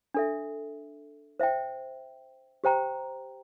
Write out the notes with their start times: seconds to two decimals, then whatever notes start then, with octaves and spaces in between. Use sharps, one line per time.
0.14 D4 A4 E5
1.40 C5 E5 G5
2.64 G4 C5 G5 A#5